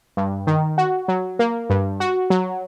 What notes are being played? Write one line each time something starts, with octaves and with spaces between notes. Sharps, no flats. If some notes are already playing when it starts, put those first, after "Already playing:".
G2
D#3
F#4
F#3
A#3
G2
F#4
F#3